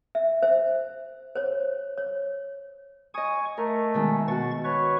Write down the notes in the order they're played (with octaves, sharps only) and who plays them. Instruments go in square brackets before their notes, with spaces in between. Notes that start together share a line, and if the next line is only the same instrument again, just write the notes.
[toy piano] E5
C5 E5
C5 C#5
C#5
[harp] D#5 D#6 [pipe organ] G#5 C#6
[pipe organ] A3 [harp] A#4
[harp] B2 D#3 G#3
[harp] B2 F#4 [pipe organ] C#6 A6
[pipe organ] B4 C#5 C#6